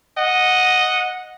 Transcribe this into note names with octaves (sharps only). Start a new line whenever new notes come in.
D#5 F#5